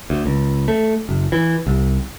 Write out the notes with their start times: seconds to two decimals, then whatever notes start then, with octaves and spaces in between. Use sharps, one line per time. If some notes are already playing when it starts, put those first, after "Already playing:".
0.10 D2
0.26 C#2
0.68 A3
1.09 F#1
1.32 E3
1.67 C2